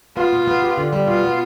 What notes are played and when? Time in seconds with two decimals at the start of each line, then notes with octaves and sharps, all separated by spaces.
0.17 B3 F4
0.33 B2
0.47 B3
0.62 G4
0.77 D3
0.93 G3
1.07 B2 F4
1.24 B3